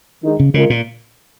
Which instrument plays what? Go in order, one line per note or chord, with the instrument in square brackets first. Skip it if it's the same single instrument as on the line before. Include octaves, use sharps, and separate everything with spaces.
[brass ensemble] D#3 G#3 D#4
[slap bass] C#3
[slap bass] C#3 [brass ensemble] G#3 F4 A#4
[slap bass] A#2